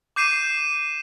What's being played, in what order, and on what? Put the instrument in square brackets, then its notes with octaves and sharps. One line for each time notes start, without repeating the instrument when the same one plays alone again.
[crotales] D6 G6 C7 D#7 E7